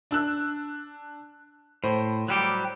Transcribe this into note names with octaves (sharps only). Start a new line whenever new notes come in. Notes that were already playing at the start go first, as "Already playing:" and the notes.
D4 E6 F#6
A2 C5
F#3 G3 G4